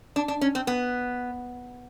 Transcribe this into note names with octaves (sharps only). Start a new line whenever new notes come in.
D4
D4
C#4
C4
B3